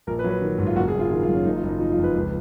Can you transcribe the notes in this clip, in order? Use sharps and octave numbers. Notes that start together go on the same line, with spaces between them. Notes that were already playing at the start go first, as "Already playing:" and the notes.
A#1 A#4
B4
F#3
B4
D#3
G#2
F4
F#1 F#4
G#4
F#1
F4
D#3 F4
F4
F#2
C#4
F#1 D#4
F4
F#1
D#4
F3 D#4
F4
F2
B4
C#2